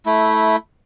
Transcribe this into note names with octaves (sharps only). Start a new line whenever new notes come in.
A3 E4